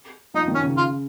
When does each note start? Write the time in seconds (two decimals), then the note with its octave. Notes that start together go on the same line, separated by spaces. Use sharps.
0.34 F3 D#4
0.48 D#3
0.55 C#4
0.62 C#3
0.77 F4